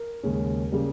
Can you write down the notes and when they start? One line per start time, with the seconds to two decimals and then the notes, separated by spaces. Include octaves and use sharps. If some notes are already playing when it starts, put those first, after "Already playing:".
Already playing: A#4
0.23 D#2 C#3 G#3 C#4
0.72 C#3 G3 A#3